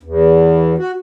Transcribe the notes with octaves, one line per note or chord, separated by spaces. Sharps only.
E2
F#4